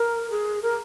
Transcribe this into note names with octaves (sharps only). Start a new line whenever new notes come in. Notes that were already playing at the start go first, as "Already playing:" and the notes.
Already playing: A#4
G#4
A#4